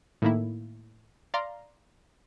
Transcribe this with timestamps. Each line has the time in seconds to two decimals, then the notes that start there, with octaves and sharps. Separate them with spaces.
0.22 A2 D#3 A#3 E4
1.34 D5 F5 A#5 C6